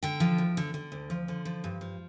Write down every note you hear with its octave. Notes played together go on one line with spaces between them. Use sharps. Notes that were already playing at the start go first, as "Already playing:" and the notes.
D3 G5
F3
D2
D3
D3
D2
F3
D3
F3
G2
F3